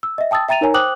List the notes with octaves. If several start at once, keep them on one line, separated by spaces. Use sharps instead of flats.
E6
D#5 E5
G5 A5 D#6 E6 A6
E5 G5 A#5 A6 D#7 F7
D#4 A#4 C#5 G#5 A#5
C5 G5 D6 D#6 F#6 F#7